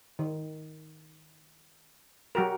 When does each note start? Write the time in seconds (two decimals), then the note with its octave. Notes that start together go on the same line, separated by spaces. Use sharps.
0.19 D#3
2.35 F#3 F#4 G4 A#4